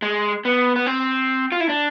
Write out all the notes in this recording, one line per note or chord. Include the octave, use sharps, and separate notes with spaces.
G#3
B3
B3
C4
F4
E4
D4